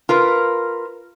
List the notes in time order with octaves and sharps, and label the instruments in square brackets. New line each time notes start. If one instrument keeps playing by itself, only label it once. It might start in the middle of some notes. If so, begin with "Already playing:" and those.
[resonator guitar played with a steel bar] F4 A#4 B4